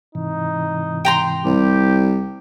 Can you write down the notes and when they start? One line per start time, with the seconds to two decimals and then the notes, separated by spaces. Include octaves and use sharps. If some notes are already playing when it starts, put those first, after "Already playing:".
0.15 G#2 C3 E3 D#4
1.05 G5 A#5 C6
1.45 C2 G4